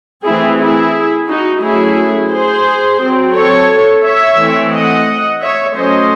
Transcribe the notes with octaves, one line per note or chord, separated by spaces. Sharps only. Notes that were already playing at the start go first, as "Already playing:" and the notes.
E3 A3 C4 E4 G#4
E4 G#4
D#4 F#4
F#3 A3 C#4 E4 G#4
G#4 C5
F#3 C4
A4 C#5
C#5 E5
E3 A3 C4
D#5 F#5
C#5 E5
F#3 A3 C#4 C5 D#5